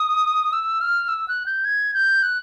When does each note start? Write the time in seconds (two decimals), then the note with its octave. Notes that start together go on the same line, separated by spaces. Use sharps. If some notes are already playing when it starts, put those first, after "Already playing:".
Already playing: D#6
0.53 E6
0.81 F6
1.08 E6
1.28 F#6
1.46 G6
1.65 G#6
1.94 G6
2.23 F#6